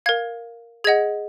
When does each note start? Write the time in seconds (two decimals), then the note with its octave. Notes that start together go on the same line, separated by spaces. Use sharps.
0.06 A#4 F5 G#6
0.84 G#4 D#5 F#5 G#6